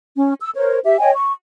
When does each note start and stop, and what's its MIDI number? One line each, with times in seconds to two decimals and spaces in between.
0.16 0.34 61
0.41 0.49 88
0.55 0.79 70
0.55 0.79 72
0.55 0.79 73
0.85 0.98 67
0.85 0.98 76
0.99 1.11 73
0.99 1.11 75
0.99 1.11 79
0.99 1.11 80
1.15 1.32 85